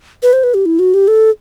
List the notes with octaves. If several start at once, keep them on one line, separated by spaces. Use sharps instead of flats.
B4
C5
B4
G4
E4
F#4
G4
A4